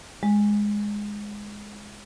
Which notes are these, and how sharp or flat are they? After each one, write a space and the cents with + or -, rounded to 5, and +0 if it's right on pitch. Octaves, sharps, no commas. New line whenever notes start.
G#3 -5